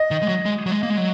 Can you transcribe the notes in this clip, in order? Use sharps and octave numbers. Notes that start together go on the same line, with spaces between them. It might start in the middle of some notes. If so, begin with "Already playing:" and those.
Already playing: D#5
D#3
G#3
F#3
G#3
F#3
G#3
A#3
G#3
F#3